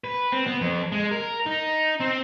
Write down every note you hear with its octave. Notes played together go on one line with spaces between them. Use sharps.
B4
C4
B3
F2
G#3
A#4
D#4
C4